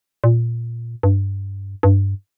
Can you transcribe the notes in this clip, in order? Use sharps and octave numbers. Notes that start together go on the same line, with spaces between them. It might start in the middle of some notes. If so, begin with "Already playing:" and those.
A#2
G2
G2